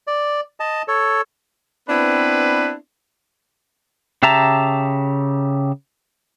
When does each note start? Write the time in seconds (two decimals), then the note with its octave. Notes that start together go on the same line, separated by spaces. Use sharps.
0.07 D5
0.60 D#5 A5
0.88 A4 C#5
1.89 B3 C4 D4 E4 B4
4.23 C#3 G4 E5 A5 A#5